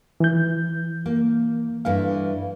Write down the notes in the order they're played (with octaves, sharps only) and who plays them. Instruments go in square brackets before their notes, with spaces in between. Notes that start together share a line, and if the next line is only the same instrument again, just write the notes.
[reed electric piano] E3 G6
[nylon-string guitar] A#3
[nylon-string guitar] G2 E3 A3 [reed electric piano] F5